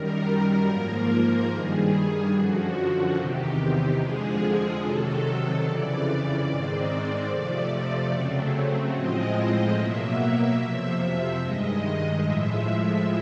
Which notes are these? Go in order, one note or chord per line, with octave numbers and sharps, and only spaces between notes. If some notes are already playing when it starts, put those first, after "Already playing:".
Already playing: F#2 D#3 G3 A#4
G#2 F3 A#3
G2 D#3 G3 G#4
F#2 D3 F3 F#4
E2 C3 D#3 G4
F2 D3 F3 G#3 G#4
C3 D#3 F#3 A4
F2 C#3 E3 D5
G#2 D#3 G#3 C4 D5
F2 C3 F3 A3
C#3 F#3 A3 C4
A2 F3 G#3 C4 D#5
B2 F#3 A#3 E5
F2 C3 F3
G2 D#3 G#3 D#5
A2 F3 G#3 E5